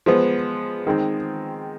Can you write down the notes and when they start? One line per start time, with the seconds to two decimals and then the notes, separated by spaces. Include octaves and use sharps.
0.06 F3 G#3 B3
0.87 D#3 G#3 C4